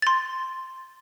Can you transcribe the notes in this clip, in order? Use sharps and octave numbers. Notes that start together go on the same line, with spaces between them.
C6 A6